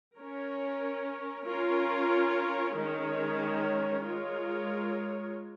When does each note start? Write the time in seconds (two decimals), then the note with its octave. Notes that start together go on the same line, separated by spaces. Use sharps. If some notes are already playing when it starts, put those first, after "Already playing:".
0.18 C#4 A#4 C#5
1.46 C#4 F4 A#4 C#5
2.76 D#3 G#3 C#4 A#4 C#5
4.03 G#3 F4 A#4 C#5